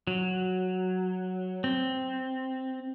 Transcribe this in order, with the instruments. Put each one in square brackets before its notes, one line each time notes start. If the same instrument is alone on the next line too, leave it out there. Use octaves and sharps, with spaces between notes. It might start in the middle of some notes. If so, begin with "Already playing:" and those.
[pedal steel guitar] F#3
C4